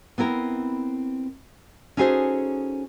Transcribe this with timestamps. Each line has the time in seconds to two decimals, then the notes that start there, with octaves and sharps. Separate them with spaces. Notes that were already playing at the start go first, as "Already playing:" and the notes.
0.18 B3 C4 E4 A#4
1.97 C#4 D#4 F#4 G#4 A4 C5